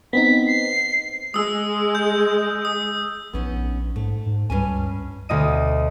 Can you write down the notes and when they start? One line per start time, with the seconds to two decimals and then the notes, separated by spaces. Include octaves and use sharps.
0.13 B3 C4 D#4 B6
0.47 C7
1.34 G#3 D#6 E6
1.95 G6
2.65 D#6
3.33 A#1 B3 C#4 D#4
3.96 G#2 A3
4.26 G#2
4.50 C#2 G2 C#4 G#5
5.29 D2 B2 D#5 D#7